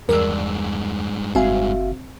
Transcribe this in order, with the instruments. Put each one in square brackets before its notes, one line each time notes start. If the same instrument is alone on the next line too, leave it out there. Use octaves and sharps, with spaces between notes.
[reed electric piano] E2 [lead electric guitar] G2 G#3 [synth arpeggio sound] A#4 D5 E6
[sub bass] F#1 [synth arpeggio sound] C4 G#5 [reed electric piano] F#4 E5 F5